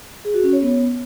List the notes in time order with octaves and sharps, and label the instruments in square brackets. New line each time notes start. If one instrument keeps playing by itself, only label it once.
[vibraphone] G#4
F#4
C#4
C#5
B3